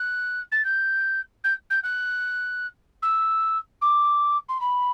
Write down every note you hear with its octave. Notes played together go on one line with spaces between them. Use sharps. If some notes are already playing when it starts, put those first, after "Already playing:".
Already playing: F#6
A6
G6
G6
G6
F#6
E6
D6
C6
B5